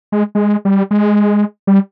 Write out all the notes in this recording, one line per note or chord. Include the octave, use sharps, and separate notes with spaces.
G#3
G#3
G3
G#3
G3